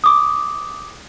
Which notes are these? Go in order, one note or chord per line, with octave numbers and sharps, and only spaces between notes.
D6 D#6